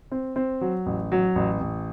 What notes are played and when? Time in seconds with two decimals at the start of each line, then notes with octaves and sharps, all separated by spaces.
0.12 C4
0.36 C4
0.61 F#3
0.86 A1
1.12 F#3
1.36 A1
1.60 A1